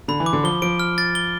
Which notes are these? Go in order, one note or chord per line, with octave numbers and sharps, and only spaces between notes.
D3 B5
E3
D6
D3
F3 G7
F3 D7
F6
A6
G7